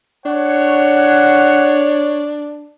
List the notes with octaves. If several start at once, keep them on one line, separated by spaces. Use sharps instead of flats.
D4 C#5 F#5